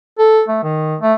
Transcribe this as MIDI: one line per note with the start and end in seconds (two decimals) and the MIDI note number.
0.19 0.42 69
0.48 0.59 57
0.63 0.96 51
1.01 1.14 57